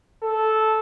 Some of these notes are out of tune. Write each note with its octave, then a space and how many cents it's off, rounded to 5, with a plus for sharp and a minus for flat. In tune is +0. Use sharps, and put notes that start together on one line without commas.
A4 -10